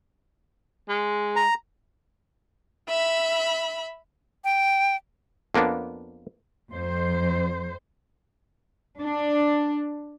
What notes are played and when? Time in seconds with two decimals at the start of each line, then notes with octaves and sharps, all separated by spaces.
0.89 G#3
1.36 A#5
2.89 E5 B5
4.44 G5
5.54 F2 A#3 B3 D4
6.71 F2 C5
9.00 D4